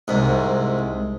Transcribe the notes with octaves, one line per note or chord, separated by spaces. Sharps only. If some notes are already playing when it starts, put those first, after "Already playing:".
C2 G#2